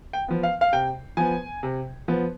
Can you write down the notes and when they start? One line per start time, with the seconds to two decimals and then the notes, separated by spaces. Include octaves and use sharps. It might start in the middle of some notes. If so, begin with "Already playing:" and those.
0.13 G5
0.28 F3 B3
0.43 F5
0.61 F5
0.72 C3 G5
1.17 F3 B3 G#5
1.63 C3
2.08 F3 B3